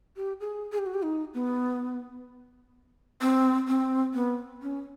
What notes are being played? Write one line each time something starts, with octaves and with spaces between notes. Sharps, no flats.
G4
G#4
G#4
G4
F#4
G4
D#4
B3
C4
C4
B3
C#4